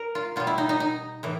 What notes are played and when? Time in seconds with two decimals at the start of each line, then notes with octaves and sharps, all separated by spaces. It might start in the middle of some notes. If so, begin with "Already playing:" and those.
Already playing: A#4
0.15 F4
0.36 B2 G3 F4
0.47 E4
0.58 D#4
0.69 D#4
0.80 D#4
1.23 A2 E3